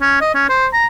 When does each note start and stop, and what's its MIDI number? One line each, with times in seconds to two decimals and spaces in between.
0.01 0.18 61
0.21 0.30 75
0.34 0.48 61
0.49 0.67 72
0.73 0.86 82